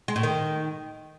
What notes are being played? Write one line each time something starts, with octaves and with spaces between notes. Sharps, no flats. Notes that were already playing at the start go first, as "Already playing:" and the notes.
G#3
A2
D#3